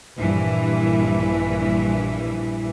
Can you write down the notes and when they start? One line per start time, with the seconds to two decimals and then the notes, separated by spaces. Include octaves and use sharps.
0.18 A#1 G2 E3